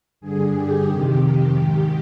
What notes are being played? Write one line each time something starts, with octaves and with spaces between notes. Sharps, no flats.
G2 D3 G#4
G4
F2 C3 D#3
G#2 D#3